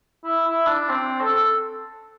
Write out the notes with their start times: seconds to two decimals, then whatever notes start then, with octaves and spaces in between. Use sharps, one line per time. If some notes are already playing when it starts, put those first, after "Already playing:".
0.24 E4
0.46 E4
0.66 D4
0.89 C4
1.21 A4